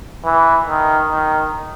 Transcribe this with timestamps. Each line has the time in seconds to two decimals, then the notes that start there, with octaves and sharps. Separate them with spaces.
0.25 E3
0.68 D#3
1.10 D#3